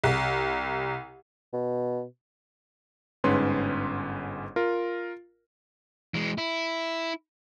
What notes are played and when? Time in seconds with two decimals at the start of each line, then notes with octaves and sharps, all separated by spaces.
0.04 C2
1.53 B2
3.24 G1 G#2 C#4 B4 C6
4.56 F4 A#4
6.14 E3 G#3
6.38 E4